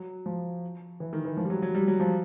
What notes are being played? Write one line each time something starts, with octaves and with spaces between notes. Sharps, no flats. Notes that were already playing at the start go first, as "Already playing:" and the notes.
Already playing: F#3
F3
E3
D#3
E3
F3
G3
F#3
F#3
G3
F#3
F3